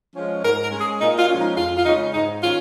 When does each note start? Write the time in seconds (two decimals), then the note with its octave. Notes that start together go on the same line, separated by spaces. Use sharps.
0.15 F3 G#3 C#4
0.43 G#2 A#4
0.63 A#4
0.72 G#3 C#4
0.81 G#4
1.01 A#2 D#4
1.19 F4
1.29 F3 G#3 C#4
1.39 D#4
1.57 F2 F4
1.77 F4
1.85 C#3 G#3 C#4 D#4
2.14 G#2 D#4
2.43 D#3 C#4 F4